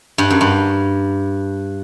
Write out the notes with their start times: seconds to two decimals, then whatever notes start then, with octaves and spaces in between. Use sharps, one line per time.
0.18 G2
0.30 F#2
0.41 G2